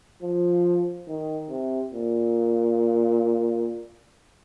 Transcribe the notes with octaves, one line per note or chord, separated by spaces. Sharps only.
F3
D#3
C3
A#2